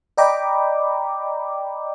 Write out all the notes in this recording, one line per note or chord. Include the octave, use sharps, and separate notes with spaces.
D5 D#5 G5 A#5 B5 D6